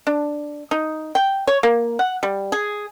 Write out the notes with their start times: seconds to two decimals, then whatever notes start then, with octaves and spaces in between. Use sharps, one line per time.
0.07 D4
0.71 D#4
1.15 G5
1.47 C#5
1.63 A#3
1.99 F#5
2.23 G3
2.52 G#4